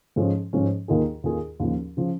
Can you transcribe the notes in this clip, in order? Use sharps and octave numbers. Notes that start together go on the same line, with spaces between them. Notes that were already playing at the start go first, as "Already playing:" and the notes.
G#2 F3 G#3 C#4
G#2 F3 G#3 C#4
D#2 D#3 A#3 F4 G#4
D#2 D#3 A#3 F4 G#4
D#2 C#3 F3
C#3 F3